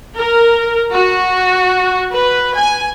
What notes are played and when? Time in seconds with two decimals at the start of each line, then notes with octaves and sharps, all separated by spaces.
0.16 A#4
0.91 F#4
2.13 B4
2.58 G#5